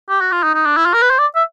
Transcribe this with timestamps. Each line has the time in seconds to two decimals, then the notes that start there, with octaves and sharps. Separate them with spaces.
0.10 G4
0.21 F#4
0.32 F4
0.43 D#4
0.54 D#4
0.66 D4
0.77 E4
0.86 F4
0.94 A#4
1.02 B4
1.10 C5
1.19 D5
1.35 E5